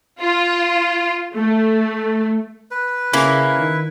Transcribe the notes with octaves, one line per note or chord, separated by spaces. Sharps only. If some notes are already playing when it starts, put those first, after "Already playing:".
F4
A3
B4
C#3 A#3 C#4 E4
D#3